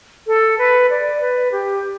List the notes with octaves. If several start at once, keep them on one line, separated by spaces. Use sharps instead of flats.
A4
B4
D5
B4
G4